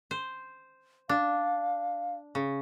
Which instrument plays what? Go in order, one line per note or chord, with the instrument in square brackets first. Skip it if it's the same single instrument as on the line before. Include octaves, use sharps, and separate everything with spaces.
[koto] C5
[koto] D4 [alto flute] F5
[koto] C#3